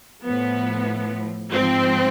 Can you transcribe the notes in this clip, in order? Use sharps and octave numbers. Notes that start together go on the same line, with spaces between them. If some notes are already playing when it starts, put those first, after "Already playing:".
A2 F3 B3
G#2 F3 C4